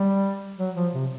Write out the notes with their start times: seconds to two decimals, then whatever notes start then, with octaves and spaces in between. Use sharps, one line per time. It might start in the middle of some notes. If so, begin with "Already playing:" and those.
Already playing: G3
0.58 F#3
0.75 F3
0.94 C3